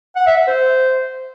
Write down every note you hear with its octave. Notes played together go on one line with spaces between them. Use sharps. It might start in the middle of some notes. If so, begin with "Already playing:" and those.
F#5
E5
E5
C5